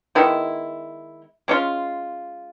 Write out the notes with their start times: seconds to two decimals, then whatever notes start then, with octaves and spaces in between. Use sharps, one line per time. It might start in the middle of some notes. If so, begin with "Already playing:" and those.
0.15 D#3 G#3 B3 E4
1.48 G#3 C#4 F4